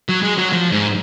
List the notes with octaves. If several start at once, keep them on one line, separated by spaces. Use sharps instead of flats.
F#3
G#3
F#3
F3
G#2